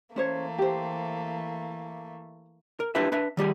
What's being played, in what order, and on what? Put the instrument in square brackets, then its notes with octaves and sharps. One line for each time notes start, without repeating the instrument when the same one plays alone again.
[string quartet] E3 A3 A#3 [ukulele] C#4 C5 C#5
[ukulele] G4 C5
[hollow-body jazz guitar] A#4
D4 E4 F4 G4 B4 E5
D4 B4 E5
D#3 G3 G4 G#4